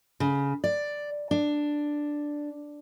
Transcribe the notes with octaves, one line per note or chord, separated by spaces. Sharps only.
C#3
D5
D4